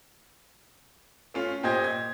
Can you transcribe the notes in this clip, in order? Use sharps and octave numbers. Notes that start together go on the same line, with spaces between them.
A3 C#4 F4
A#2 G4 C5 D#5 G#6
G#6